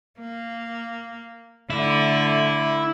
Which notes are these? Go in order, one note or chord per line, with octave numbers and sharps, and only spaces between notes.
A#3
D3 A3 E4